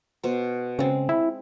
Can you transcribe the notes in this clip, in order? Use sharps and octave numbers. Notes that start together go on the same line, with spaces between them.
B2 C5
C#3 G#3 C4
E4